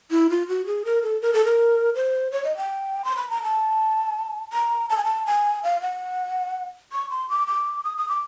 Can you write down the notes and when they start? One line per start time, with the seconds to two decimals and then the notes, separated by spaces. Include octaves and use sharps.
0.11 E4
0.30 F4
0.48 F#4
0.66 G#4
0.85 A#4
1.03 A4
1.22 A#4
1.33 A4
1.45 A#4
1.95 C5
2.32 C#5
2.44 D#5
2.57 G5
3.05 C6
3.17 B5
3.30 A#5
3.43 A5
4.53 A#5
4.90 A5
4.97 G#5
5.04 A5
5.26 G#5
5.64 F5
5.82 F#5
6.92 C#6
7.10 C6
7.29 D6
7.47 D6
7.84 D#6
7.97 D#6
8.09 D6